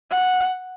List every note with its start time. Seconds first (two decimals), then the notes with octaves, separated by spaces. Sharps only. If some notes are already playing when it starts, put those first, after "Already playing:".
0.11 F#5